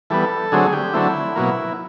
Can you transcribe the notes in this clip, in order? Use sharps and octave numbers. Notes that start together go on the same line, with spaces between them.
E3 G3 B3 A4
D3 F#3 A3 C4 G#4
G4
D3 F#3 A3 C4 E4
B2 F#3 A#3